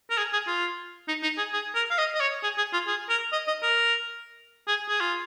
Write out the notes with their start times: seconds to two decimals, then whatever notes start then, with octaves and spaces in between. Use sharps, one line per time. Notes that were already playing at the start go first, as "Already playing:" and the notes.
0.10 A#4
0.18 G#4
0.33 G#4
0.47 F4
1.08 D#4
1.23 D#4
1.38 G#4
1.53 G#4
1.75 A#4
1.91 F5
1.98 D#5
2.15 D#5
2.20 C#5
2.43 G#4
2.58 G#4
2.73 F4
2.88 G#4
3.10 A#4
3.33 D#5
3.48 D#5
3.63 A#4
4.68 G#4
4.89 G#4
5.01 F4